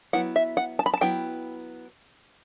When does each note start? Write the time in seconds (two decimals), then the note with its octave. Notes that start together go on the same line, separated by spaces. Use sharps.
0.13 F#3 B3 E4 F#5
0.36 E5
0.57 F#5
0.79 A5
0.86 B5
0.94 A5
1.01 F#3 B3 E4 G5